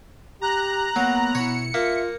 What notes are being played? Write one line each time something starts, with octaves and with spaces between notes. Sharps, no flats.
G4 A#5 F#6
F#3 A#3 B3
B2 E4 C#5 C#7
A#3 F4 E5